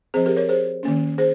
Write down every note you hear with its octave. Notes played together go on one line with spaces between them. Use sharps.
F3 C4 G#4 C5
G4 A#4
A#4 C#5
G#4 C5
D#3 A#3 C#4
G#4 C5